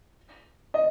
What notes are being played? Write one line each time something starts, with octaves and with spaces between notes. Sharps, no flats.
D#5